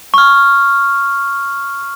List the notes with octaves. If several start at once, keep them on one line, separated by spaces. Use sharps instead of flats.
C#6 F6